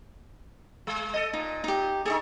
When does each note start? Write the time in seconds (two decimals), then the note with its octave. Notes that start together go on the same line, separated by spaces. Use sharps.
0.87 G#3
1.14 A4 D#5
1.33 A#2 D#4
1.64 D#4 G4
2.06 D#4 G#4 A4 D#5 C#6